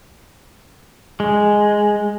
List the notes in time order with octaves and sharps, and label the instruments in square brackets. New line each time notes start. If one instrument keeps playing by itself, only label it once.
[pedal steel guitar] G#3